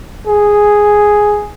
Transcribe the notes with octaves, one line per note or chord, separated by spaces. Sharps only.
G#4